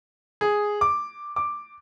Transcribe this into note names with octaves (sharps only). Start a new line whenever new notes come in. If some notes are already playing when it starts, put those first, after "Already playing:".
G#4
D6
D6